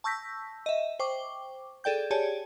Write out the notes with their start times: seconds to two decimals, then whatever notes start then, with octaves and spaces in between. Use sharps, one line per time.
0.04 A5 C#6 E6 G6 A#6 B6
0.66 D#5 E5
0.99 C5 G5 C#6 D6
1.84 G#4 A4 D5 G5 G6
2.10 G4 G#4 C#5 D5 G#5 A5